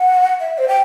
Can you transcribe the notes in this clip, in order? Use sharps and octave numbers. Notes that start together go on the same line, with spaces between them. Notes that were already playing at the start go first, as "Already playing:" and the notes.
Already playing: F#5
E5
C5
G5